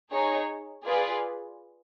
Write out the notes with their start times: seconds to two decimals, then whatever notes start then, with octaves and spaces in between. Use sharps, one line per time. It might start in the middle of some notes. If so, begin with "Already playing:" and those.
0.11 D#4 G#4 C#5
0.84 F4 G#4 B4 D5